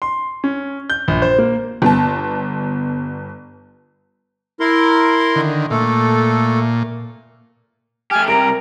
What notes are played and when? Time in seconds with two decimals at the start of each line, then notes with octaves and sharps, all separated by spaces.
0.02 C6
0.44 C#4
0.90 G6
1.08 A#1
1.22 C5
1.39 A#3
1.82 G1 B3 A5
4.60 E4 A#4 C6
5.36 D3 D#3
5.70 A#2 A3 A4
8.11 A3 G4 G#5 F6
8.28 C3 G3 A#4 A#5 D7